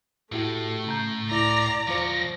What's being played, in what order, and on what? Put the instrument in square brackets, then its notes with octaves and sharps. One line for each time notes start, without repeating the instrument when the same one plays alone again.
[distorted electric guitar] A2 [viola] A3 [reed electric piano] E4 F#4 G4
[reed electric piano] C#3 A#5 G6
[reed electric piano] C#2 E4 [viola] D5 A#5 [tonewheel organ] A#6
[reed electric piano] E2 F4 C5 [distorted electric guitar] F3 C#5